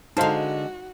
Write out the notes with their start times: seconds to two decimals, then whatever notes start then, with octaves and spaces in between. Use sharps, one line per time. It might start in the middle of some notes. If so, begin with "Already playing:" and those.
0.17 D3 G#3 D#4 F#4 C5 F5 A5